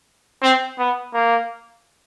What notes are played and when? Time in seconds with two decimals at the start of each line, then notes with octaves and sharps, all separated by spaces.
0.43 C4
0.79 B3
1.14 A#3